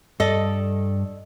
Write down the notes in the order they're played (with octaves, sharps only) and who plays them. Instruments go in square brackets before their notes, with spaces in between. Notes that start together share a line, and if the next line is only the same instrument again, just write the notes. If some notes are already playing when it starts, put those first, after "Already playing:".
[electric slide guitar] G2 D5 [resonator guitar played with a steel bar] A4 D#5